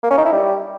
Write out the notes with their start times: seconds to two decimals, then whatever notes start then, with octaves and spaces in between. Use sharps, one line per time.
0.03 A#3
0.11 C#4
0.18 D#4
0.25 E4
0.32 G3